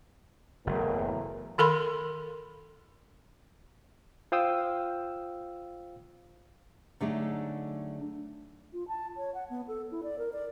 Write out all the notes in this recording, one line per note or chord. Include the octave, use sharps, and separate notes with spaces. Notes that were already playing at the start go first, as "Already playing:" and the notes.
F#1 E2 A2 A#4
D#3 A4 A#4 B5 C6
F4 C5 F5 G5 D#6 E6
D3 F#3 A3 D4 D#4 G#4
F4
A5
C#5
F#5
B3
A4
E4
D5
A#4
D5